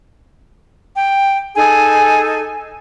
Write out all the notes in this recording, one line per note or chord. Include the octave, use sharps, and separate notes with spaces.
G5
D#4 G#4 A4 G#5